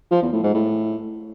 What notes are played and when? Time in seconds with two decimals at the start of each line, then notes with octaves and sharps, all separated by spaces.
0.11 F3
0.22 E2
0.33 A2
0.43 G#2
0.54 A2